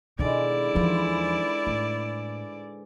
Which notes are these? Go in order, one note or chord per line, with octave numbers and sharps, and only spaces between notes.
G#2 B2 D3 D#3 G#3 E4 D5
E2 F3 B4 C5
A2